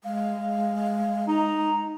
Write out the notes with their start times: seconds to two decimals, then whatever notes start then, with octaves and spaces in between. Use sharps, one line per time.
0.04 G#3 F5
1.28 D#4 A#5